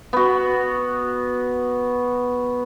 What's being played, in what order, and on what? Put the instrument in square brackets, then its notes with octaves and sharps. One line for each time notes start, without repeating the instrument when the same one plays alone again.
[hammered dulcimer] B3 F#4